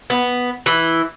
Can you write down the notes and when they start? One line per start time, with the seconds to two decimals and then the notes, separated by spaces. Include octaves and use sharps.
0.10 B3
0.66 E3